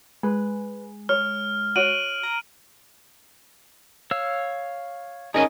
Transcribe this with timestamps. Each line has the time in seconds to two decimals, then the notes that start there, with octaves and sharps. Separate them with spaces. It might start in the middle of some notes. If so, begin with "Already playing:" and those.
0.23 G#3 B4
1.09 C#5 F6
1.76 F#4 C#5 D7 D#7 F#7
2.23 A#5
4.11 C#5 F5 E6
5.34 C#4 D#4 G#4 A#4 D#5